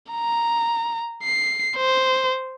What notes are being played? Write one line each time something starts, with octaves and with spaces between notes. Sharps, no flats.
A#5
C7
C5